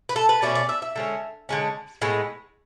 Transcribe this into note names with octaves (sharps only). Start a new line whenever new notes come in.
B4
A4
B4
B2 A3 C#4 D5
D5
E5
E5
D3 G#3 C#4
D3 G#3 C#4
A2 G#3 B3